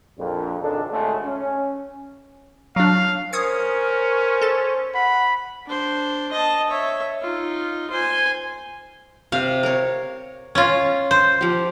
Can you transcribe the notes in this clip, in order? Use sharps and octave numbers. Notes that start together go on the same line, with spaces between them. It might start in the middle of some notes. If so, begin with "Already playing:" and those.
A#1 F2
G#1 C#2 D4 A4
G#1 D#2 G#2 C#3 A3
C#4
F#3 D4 F5
C#4 A#4 C5 D#6 G#6 C#7
A4 A6
F#5 B5
D4 C5
D#5 A5
C#5 E5
D#4 F4
C5 G#5
C3 F5
A#4 C#5
C#4 F4
C5
F3 G4